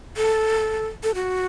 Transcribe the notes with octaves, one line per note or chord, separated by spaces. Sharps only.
A4
A4
F#4